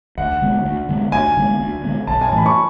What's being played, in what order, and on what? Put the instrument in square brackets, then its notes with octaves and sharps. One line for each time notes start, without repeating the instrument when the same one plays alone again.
[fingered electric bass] D2 [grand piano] F#5
[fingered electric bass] D3 G#3 B3
D2
D3 G#3 B3
[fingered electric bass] D2 [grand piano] G#5
[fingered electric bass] D3 G#3 B3
D2
D3 G#3 B3
[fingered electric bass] B1 [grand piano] A5
[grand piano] G#5
[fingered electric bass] A2 E3 A3 [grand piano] A5
[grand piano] B5
C#6